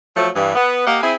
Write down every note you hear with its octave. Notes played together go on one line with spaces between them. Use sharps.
F3 F#3 A3
G2 E3
B3
A#3 G4 D#5 F5 F#5
C4 E4 G#4